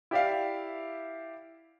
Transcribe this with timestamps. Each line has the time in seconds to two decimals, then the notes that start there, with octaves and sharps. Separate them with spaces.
0.11 E4 G4 D5 E5 F5